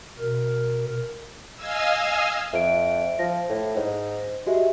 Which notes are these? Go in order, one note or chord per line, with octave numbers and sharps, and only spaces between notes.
B2 A#4
D#5 F5 G#5 E6
F2 E5 D7
F3 A#6
A2
G#2
G#3 F#4 G4 E5